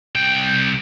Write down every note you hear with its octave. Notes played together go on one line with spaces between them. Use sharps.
C2 G5